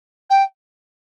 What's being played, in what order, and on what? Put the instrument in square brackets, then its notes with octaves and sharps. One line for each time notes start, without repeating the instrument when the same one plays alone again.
[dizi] G5